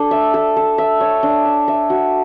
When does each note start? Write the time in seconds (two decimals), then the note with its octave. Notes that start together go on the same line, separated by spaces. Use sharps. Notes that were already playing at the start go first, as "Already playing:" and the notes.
Already playing: D4 A4
0.11 E5
0.34 A4
0.56 A4
0.78 E5
1.00 C#5
1.23 D4
1.45 E5
1.68 E5
1.90 F#4